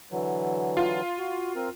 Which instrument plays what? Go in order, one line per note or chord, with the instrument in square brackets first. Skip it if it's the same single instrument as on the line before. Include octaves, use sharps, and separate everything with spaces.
[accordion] D3 E3 F#3
[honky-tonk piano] F4
[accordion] F#4
C4 A#4